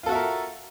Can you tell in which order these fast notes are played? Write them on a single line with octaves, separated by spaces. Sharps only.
F4 A4 F#4 E5 A#4